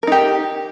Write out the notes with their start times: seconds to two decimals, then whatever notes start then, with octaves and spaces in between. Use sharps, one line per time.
0.03 A#4
0.07 D#4
0.12 G4